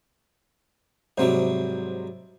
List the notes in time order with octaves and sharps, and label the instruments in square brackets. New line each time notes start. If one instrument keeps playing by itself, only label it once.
[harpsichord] G#2 F#3 G3 [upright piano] C3 C5